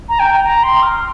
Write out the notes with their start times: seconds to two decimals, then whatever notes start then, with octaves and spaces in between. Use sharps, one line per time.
0.09 A#5
0.19 G5
0.44 A#5
0.63 C6
0.82 F6